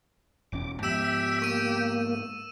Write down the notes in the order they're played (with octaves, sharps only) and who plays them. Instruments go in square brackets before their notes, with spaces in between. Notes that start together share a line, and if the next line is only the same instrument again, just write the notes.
[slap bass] E1 E2 C#4 [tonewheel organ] D6
[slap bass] G#2 F3 B3 [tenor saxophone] G4 [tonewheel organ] E5 [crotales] E6 E7
[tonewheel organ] A#3 [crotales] C#6 D#7